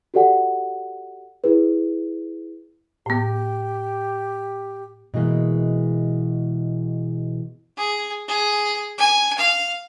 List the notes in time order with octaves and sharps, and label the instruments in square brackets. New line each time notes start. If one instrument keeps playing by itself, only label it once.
[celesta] F#4 G4 A4 D5 F#5 G#5
E4 G#4 B4
[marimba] A2 B3 [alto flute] G4
[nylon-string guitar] B2 E3 G#3 A#3
[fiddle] G#4
G#4
G#5
F5